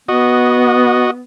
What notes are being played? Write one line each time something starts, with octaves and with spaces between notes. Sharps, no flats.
B3 F#4 D#5